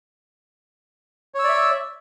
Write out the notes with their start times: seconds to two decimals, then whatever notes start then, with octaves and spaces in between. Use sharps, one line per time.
1.35 C#5
1.39 E6
1.44 D5
1.49 E5